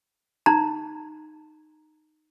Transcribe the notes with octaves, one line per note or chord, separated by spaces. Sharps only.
D#4 A#5